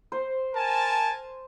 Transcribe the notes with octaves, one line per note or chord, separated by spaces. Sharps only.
C5
A#4 G#5 A5